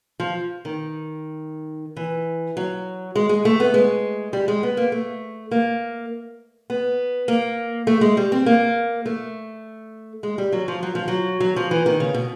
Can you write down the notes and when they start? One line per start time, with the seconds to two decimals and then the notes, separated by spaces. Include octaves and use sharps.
0.20 F3
0.65 D#3
1.97 E3
2.57 F#3
3.16 G#3
3.29 G#3
3.45 A3
3.60 B3
3.74 G#3
4.33 G3
4.48 G#3
4.63 B3
4.77 A#3
4.92 A3
5.51 A#3
6.70 B3
7.28 A#3
7.87 A3
8.01 G#3
8.17 G3
8.32 C4
8.46 A#3
9.06 A3
10.23 G#3
10.38 G3
10.52 F#3
10.68 F3
10.83 F#3
10.95 F3
11.08 F#3
11.40 F#3
11.56 F3
11.71 E3
11.86 D#3
12.00 C#3
12.14 B2